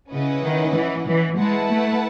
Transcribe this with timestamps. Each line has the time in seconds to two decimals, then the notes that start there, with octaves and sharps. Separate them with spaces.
0.10 C#3 C#4 E4 B4 D#5 F#5
0.43 D#3
0.74 E3
1.06 E3
1.39 G#3 E4 B4 F#5 A5
1.70 A3